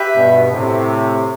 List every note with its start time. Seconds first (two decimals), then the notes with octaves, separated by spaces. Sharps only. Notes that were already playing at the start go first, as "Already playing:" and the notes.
Already playing: G4 B4 E5
0.15 G2 B2
0.51 A2 C3